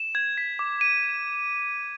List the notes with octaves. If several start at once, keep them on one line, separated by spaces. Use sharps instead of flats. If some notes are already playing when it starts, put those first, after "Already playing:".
Already playing: E7
G#6
B6
D6
D#7